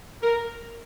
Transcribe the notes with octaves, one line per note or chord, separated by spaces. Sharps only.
A#4